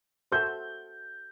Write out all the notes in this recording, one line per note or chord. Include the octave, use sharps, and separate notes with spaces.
F#4 A4 C5 E5 G6